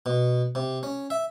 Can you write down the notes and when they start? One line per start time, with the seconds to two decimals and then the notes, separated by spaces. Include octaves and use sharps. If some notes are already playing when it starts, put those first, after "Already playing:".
0.06 B2
0.55 C3
0.83 C#4
1.10 E5